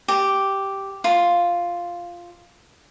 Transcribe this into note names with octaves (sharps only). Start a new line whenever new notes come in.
G4
F4